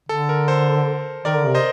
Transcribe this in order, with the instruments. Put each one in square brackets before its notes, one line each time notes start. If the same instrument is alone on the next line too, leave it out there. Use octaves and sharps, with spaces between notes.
[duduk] D3 [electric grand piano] A4
[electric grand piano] A#4
A4 C5
[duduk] D#3 [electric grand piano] A#4 D5
[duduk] D3
C3
[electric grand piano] C5 D#5